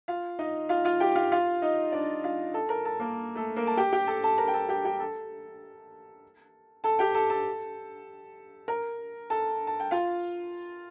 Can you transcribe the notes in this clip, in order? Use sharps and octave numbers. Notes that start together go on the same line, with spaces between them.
F4 F5
D#4 D#5
F4 F5
F4 F5
G4 G5
F4 F5
F4 F5
D#4 D#5
D4 D5
F4 F5
A4 A5
A#4 A#5
A4 A5
A#3 A#4
A3 A4
A#3 A#4
A5
G4 G5
G4 G5
A4 A5
A4 A5
A#4 A#5
G5
A4 A5
G4 G5
G4 G5
A4 A5
A4 A5
G4 G5
A4 A5
A4 A5
A#4 A#5
A4 A5
A5
G5
F4 F5